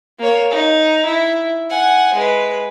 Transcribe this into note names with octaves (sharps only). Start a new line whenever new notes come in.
A#3 C#5
D#4
E4
F#5 G#5
G#3 B4